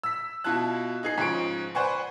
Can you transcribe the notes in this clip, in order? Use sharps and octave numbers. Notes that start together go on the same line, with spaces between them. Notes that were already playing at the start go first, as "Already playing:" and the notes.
E6 B6
B2 E4 F4 A5 F#6
D#4 G#4 C7
G#2 C#3 F3 C#6 D7
B4 C5 D5 F#5 G#5 C#6